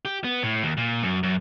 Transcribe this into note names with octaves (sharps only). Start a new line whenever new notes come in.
G4
B3
A2
D#2
A#2
F#2
F#2